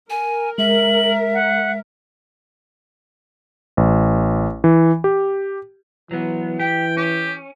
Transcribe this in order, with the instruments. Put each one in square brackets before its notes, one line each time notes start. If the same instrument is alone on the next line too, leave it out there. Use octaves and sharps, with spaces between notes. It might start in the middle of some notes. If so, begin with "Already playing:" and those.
[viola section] A#4 [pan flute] G#5
[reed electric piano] G#3 [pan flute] E5 [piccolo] F#7
[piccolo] F#5
[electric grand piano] A1
E3
G4
[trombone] E3 [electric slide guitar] F#3 B3
[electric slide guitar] G4 [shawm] G5
[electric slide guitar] C#4 [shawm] G4